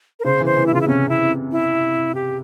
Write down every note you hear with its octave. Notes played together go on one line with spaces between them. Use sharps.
A#4
C#3 C5
E3
C5
E3
E4
C#3 F4
E4
C3 C#4
E4
E4
G4